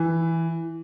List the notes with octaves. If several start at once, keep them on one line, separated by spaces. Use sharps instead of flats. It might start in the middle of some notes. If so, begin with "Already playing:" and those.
Already playing: E3